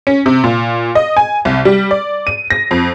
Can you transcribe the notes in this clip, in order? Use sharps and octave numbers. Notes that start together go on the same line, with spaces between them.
C#4
C3
A#2
D#5
G#5
C2
G3
D5
D#7
A#6
F2